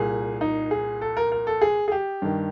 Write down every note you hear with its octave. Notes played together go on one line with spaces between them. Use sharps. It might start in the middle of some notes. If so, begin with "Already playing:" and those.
Already playing: C2 A#2 G#4
D#4
G#4
A4
A#4
A#4
A4
G#4
G#4
G4
G2 D#3